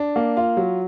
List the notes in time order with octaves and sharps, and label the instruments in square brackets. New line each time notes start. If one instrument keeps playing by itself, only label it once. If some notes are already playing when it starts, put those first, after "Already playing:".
Already playing: [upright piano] D4
A#3
F4
F#3